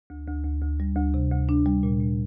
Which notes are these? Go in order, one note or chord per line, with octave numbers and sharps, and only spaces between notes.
D2
D2
D2
D2
G3
D2
C3
D2
D4
G3
A#2
A#2